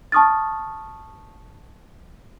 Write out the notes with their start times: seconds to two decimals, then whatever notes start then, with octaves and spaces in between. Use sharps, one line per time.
0.12 A5 C#6 D#6 F6 A6